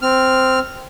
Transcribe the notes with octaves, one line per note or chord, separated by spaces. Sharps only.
C4 F6